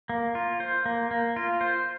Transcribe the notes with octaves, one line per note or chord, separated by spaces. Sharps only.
A#3
F4
C5
A#3
A#3
F4
C5